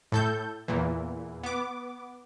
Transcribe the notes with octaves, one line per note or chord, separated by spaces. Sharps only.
A2 A4 G6
E2 A#2 E3
B3 D6